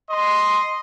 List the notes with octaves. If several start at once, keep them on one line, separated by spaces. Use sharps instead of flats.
D#5 C6